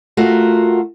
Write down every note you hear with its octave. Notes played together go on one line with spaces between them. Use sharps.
A3 F4 F#4 A#4